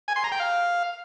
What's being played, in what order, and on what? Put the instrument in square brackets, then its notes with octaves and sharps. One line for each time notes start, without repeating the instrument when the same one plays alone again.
[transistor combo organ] G#5
C6
A#5
G5
F5